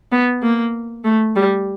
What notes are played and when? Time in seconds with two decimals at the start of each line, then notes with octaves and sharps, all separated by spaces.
0.12 B3
0.43 A#3
1.05 A3
1.36 G3